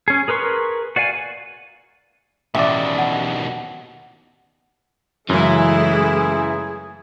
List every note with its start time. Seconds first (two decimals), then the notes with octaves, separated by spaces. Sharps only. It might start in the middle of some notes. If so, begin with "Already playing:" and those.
0.08 C#4 G#4
0.28 G#4 A#4 B4 C6 C#6
0.96 F#4 D5 F5 G#5
2.55 A1 D#2 B2 D5 E5
2.98 F#5
5.30 F#2 C#3 E3 G#3 A3 E4 G#4